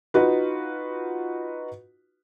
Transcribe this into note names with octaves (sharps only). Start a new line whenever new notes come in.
D#4 F4 F#4 B4